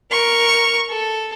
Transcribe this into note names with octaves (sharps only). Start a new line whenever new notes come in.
A#4 C#6
A4